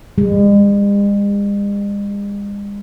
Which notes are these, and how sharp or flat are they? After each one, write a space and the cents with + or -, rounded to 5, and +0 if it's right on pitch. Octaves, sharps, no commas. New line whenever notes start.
G#3 -45